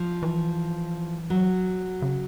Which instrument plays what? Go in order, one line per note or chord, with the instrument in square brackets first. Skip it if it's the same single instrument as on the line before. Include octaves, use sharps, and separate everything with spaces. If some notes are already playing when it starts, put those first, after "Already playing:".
Already playing: [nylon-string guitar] F3
[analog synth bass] E3
[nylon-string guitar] F#3
[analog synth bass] C#3